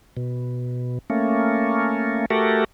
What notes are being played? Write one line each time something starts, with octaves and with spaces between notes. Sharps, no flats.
B2
A3 A#3 C#4
A3 F#4 G4 A4 A#4